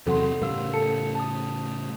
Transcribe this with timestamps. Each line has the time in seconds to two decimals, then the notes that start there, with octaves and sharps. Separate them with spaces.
0.07 E2 C3 F#3 A4 F#5 C6
0.42 A2 C#3 G3 A#4 F5 E6
0.74 A4 A5 C#7
1.15 A5 D#6